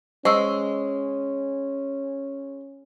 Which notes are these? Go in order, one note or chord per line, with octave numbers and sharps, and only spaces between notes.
G#3 C#4 C5 C#6 E6